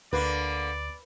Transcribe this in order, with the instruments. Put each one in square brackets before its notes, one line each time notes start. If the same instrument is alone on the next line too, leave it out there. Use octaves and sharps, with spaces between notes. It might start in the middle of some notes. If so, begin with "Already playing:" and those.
[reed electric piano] D2 [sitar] D3 A#3 [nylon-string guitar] B4 [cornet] D5